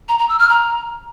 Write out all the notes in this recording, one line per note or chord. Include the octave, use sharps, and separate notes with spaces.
A#5
A#5
E6
F6
A#5